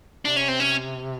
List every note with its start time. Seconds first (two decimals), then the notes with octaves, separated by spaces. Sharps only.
0.25 C3 D4
0.36 C#4
0.48 C4
0.60 C#4